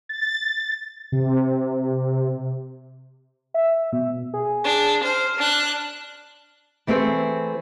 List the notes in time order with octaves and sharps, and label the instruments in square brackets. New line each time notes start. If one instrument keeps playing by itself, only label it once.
[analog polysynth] A6
C3
[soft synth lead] E5
B2
G#4
[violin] D4
[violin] C5 [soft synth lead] F6
[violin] D4 F#6
[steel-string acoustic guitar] E3 A3 C4 G#4 C5